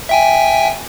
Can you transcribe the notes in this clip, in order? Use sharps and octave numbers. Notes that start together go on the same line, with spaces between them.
E5 G5 G#5